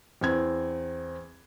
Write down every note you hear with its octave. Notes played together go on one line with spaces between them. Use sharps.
E2 C4 G#6